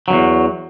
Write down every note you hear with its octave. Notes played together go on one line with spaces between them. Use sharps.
E2 G2 F#3